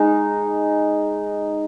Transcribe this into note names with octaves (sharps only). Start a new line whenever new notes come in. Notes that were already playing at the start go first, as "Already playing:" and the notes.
Already playing: G#3 D#4